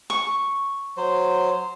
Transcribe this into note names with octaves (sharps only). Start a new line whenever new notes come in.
C#6
F#3 C5